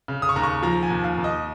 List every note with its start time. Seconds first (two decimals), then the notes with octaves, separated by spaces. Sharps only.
0.08 C#3
0.22 D#6
0.29 C#6
0.36 D#2 A#5
0.43 C#6
0.63 F3 A#5
0.83 G#5
0.90 D#2
1.04 F5
1.18 D#2
1.24 D#5